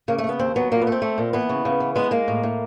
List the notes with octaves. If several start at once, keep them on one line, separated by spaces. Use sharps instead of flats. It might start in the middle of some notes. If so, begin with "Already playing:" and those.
C#3 A#3
A3
C#3
B3
D#2 C4
F#3 B3
A#2 A#3
B3
A3 C4
A3
A#2
E3 B3
C#3
C#3
E3
G#3 B3
G#3 A#3
A2
A2